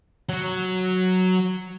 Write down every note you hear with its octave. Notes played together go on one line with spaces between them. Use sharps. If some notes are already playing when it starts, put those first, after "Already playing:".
F#3 F#4